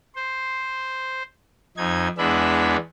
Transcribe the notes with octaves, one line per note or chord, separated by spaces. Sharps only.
C5
F2 D#4 G#6
E2 G#3 B3 D4 E5 B5